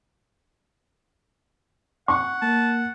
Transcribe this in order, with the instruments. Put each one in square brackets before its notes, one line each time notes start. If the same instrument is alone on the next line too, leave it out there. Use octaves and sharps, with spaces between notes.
[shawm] F#5 [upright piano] C#6
[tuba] A#3 [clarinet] A5